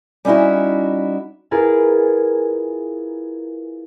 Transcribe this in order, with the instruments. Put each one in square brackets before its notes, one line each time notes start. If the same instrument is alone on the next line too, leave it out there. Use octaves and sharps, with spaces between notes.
[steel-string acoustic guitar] G3 C#4 D#4 E4 F#4
[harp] E4 F4 G#4 A#4 B4